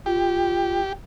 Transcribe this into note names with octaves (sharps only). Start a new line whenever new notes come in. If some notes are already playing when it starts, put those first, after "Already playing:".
F4 G4